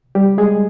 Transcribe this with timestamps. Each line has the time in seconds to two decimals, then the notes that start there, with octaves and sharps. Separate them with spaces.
0.15 G3 G4
0.38 G#3 G#4